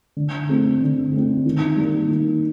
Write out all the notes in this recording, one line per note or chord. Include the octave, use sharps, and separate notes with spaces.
D3
A3 C4
D3
A3 C4
D#3
G3 A#3
D#3